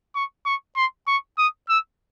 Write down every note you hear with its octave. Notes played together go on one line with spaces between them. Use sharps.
C#6
C#6
C6
C#6
D#6
E6